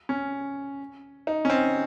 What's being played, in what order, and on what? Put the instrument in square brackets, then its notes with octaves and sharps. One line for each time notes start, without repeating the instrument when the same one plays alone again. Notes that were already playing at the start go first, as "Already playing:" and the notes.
[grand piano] C#4
D#4
C#4
C4